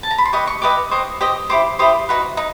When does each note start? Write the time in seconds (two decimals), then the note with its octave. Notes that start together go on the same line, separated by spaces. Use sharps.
0.03 A5
0.11 A#5
0.18 B5
0.25 C6
0.33 G4 B4 D#5 C#6
0.47 C#6
0.62 G4 B4 D#5 D6
0.91 G4 C5 D#5 C#6
1.21 G4 C5 D#5
1.50 E4 G4 C5 D6
1.79 E4 G4 C5 D#6
2.09 D#4 F#4 B4
2.37 D#4